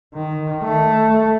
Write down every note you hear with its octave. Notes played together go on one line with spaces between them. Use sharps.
D#3
A3